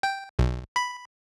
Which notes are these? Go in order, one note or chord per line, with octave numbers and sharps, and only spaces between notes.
G5
B1
B5